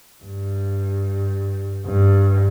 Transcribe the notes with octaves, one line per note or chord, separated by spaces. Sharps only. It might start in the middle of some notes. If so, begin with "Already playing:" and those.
G2
G2